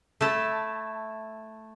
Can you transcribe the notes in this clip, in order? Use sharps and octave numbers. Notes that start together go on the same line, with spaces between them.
A3 E4 A5